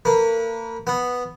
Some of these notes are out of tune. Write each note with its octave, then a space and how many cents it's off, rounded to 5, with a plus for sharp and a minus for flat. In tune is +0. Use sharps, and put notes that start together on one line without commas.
A#3 -40 B4 -30
B3 +0 F#5 -5